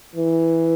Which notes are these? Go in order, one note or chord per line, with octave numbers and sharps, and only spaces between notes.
E3